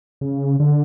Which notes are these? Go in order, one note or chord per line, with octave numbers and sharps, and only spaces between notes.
C#3
D3